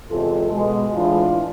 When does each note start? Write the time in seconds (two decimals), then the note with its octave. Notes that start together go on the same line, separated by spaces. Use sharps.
0.09 E2 C3 G#3 F4 A4
0.52 B2 G#3
0.93 A2 E3 G#3 D4 F4